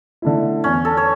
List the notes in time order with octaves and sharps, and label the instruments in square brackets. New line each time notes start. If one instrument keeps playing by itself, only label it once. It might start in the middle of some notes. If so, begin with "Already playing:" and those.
[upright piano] D3 A3 E4
[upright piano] E2 [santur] C#4
[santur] A4
C#5